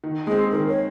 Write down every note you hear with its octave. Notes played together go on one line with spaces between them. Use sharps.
D#3
G#3 C4 G#4
D#3 A#4
C#5